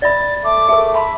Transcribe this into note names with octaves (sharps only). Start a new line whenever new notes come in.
D5 E5 B5 A6
A3 D6
A3 G#4 A#4
E5 A5 B5 C6